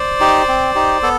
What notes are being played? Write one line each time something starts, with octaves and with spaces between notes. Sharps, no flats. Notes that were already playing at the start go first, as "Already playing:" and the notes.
Already playing: C5 D5
D#4 G4
C4
D#4 G4
B3 A4